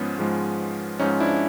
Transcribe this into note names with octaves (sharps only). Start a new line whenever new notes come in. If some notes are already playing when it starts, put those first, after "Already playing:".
Already playing: G#2 F3 G#3 B3 C#4
G#2 F3 G#3
G#2 F3 G#3 C#4 D#4
D4 E4